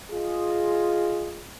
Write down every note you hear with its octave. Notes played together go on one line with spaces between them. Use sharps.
F4 G#4 D#5